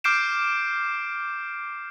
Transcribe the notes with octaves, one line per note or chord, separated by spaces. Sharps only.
D6 F6 G6 C7 D7 E7